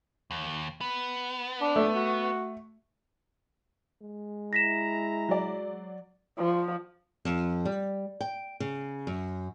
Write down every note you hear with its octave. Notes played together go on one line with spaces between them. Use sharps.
D#2
B3
D4
A3
F#4
G#3
E4 A#5 A#6 B6 E7
F#3 D5
F3
F2
G3
G5
C#3
F#2